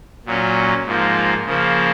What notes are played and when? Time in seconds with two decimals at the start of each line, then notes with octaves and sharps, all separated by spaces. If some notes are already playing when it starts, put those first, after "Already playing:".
0.26 A#2 F#3 C#4
0.86 G#2 F3 A#3
1.46 C#3 F3 A#3